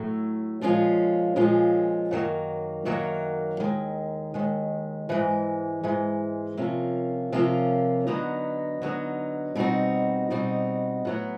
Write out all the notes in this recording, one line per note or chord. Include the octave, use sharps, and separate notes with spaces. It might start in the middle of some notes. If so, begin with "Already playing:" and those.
Already playing: A2 F#3 A3
A#2 F3 G#3 C#4 F4
A#2 F3 G#3 C#4 F4
F#2 D#3 F#3 A#3
F#2 D#3 F#3 A#3
D#2 D#3 G#3
D#2 D#3 G#3
G#2 E3 G#3
G#2 E3 G#3
C3 F3 A#3 C#4 F4
C3 F3 A#3 C#4 F4
D3 F#3 B3 D#4
D3 F#3 B3 D#4
B2 G3 C4 D#4 F#4
B2 G3 C4 D#4 F#4
A2 F#3 B3